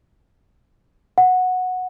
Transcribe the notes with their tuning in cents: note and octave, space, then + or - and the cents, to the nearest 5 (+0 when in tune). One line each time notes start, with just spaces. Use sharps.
F#5 -10